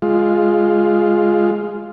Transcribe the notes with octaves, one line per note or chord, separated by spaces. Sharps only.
G#3 F4